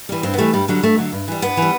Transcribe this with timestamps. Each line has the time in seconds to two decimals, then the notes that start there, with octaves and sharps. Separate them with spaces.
0.09 E3 G3
0.23 G2 C4
0.33 B3
0.38 E3 G3 A3
0.53 G2 G3
0.68 D3 F#3 G3
0.83 G2 A3
0.98 D3 F#3
1.12 G2
1.28 E3 G3
1.42 G2 B3
1.57 E3
1.62 G3